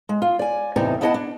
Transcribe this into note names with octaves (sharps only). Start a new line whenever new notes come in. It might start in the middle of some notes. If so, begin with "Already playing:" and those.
G#3
F4
D5 G#5
E2 A2 C3 D#4 D5 A5
B3 D4 E4 D#5 F#5 A5
D4